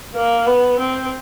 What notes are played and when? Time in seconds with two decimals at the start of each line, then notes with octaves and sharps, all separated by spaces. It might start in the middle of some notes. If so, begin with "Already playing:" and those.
0.15 A#3
0.46 B3
0.79 C4